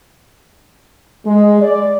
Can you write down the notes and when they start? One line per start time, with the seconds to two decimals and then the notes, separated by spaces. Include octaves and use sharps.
1.26 G#3
1.61 D5